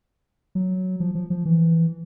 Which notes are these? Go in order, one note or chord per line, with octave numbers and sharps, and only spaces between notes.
F#3
F3
F3
F3
E3